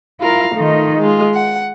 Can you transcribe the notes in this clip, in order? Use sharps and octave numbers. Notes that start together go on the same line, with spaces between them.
E4 F4 A#4 F5 A#5
D#3 A3 D#4 F4
G#3 F4
F#5